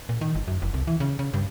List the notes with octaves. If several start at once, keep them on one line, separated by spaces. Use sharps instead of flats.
A#2
D#3
G1
F#2
F#1
C2
E3
C#3
C#3
G2